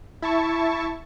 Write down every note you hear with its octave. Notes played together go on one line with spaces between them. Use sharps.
E4 A5 C#6